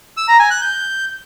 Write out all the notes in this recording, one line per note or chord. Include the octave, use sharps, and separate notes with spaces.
E6
A#5
G#5
F#6
G6